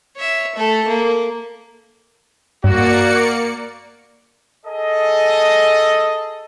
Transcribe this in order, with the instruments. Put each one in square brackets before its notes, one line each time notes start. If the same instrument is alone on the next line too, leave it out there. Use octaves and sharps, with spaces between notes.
[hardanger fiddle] C#5 E5
A3 A4
A#3
[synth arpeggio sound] G2 [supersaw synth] A#3 D5 C#7 [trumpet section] F#4
[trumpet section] G#4 A4 D#5